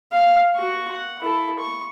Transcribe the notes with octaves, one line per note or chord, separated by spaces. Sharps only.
F5
F#4 C#6
F#5
E4 A4
C#6